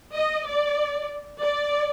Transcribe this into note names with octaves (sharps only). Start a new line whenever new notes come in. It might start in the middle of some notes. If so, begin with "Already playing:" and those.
D#5
D5
D5